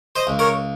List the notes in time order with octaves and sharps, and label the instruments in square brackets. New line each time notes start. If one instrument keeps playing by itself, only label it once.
[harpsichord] C5 D#5
C#2
A#4 C#5